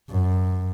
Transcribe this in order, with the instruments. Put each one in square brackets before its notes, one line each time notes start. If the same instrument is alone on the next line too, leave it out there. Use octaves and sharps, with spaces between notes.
[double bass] F#2